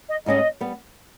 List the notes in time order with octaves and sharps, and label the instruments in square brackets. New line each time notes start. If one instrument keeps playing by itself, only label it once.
[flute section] D#5
[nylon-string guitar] G#2 G3 C#4 G#4 [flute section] D#5
[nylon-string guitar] G3 B3